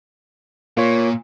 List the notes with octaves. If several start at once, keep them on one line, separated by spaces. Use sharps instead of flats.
A#2 A#3 F4 C#5